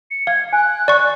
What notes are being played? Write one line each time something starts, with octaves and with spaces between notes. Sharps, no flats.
C#7
F5 G#6
G#5 F#6
D5 C#6